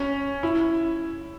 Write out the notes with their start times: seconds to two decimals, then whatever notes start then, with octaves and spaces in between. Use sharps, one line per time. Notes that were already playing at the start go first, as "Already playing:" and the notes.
Already playing: C#4
0.43 E4